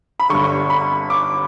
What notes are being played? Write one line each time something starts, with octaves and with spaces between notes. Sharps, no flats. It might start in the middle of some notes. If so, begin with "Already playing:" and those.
B5
G1 G2 D3 C#6
B5
D6